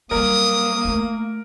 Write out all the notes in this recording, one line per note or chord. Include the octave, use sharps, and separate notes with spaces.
F#3 G3 A#3 A#4 D#6
A3 E4